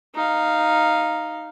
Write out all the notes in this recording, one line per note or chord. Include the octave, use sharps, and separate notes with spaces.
D#4 F5